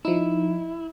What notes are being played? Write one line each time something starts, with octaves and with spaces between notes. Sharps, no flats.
F3 D#4 E4